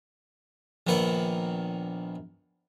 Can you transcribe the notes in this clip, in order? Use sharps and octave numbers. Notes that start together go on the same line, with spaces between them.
A#1 D#3 B3 A#4 F#5